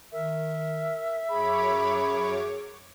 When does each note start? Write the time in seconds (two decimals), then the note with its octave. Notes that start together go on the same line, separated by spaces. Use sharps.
0.12 D#3 A#4 E5
1.29 F#2 G#4 C#5 B5 D6